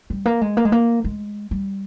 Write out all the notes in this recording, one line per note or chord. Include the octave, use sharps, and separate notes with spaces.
G3
A#3
G#3
A#3
G#3
A#3
G#3
G3